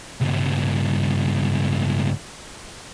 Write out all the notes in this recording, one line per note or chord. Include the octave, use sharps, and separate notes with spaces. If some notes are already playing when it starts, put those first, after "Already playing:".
C#2 G2